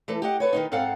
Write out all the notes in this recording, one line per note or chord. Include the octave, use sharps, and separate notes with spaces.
E3 A3 A4
G4 D#5 F#5
A4 B4 C#5
D#3 B3 D#4
G#2 C4 A4 F5 F#5